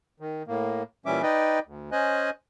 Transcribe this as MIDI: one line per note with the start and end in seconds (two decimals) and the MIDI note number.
0.20 0.43 51
0.48 0.83 45
0.48 0.83 58
1.06 1.22 46
1.06 1.22 52
1.06 1.22 55
1.06 1.22 61
1.06 1.22 76
1.06 1.22 86
1.23 1.59 63
1.23 1.59 71
1.23 1.59 74
1.23 1.59 75
1.23 1.59 79
1.66 1.90 38
1.92 2.30 61
1.92 2.30 72
1.92 2.30 75
1.92 2.30 80
1.92 2.30 90